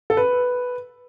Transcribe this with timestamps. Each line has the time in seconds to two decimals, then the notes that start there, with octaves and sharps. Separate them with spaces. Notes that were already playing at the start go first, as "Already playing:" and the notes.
0.10 A4
0.17 B4